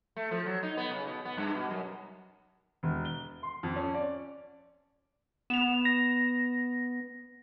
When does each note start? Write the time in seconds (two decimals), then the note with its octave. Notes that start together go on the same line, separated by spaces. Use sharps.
0.16 A3
0.31 F3
0.46 F#3
0.63 D#4
0.77 B3
0.91 C#3
1.07 B2
1.25 B3
1.37 G2
1.55 B2
1.70 F#2
2.83 E1
3.05 G7
3.43 C6
3.63 F2
3.76 C#4
3.94 D5
5.50 B3 E7 F7
5.85 A#6